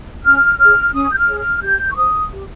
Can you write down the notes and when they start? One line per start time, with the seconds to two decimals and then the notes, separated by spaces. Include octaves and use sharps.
0.24 C#4 F6
0.59 G#4 C#5 F6
0.93 C#4 D#6
1.12 G6
1.17 F6
1.28 G#4 C#5
1.40 F6
1.62 G4 G6
1.92 C#6
1.96 C5 D#6
2.31 G4